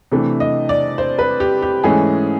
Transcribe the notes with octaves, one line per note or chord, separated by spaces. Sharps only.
C3 E3 A3 D4
D#5
D5
C5
B4
G4
G4
G#2 E3 A3 C#4 G#4